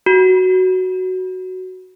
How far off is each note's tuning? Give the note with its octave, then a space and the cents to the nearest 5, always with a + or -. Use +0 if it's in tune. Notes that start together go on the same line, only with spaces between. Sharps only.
F#4 +5